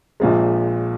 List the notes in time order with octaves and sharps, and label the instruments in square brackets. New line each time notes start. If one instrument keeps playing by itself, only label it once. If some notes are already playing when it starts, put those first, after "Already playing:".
[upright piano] A#1 A#2 F3 G#3